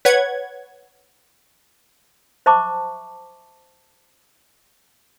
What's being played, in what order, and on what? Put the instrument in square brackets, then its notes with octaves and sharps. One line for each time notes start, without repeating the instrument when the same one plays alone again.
[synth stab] B4 C#5 F#5 G#6
[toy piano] C5 E5 A5 C#6 D6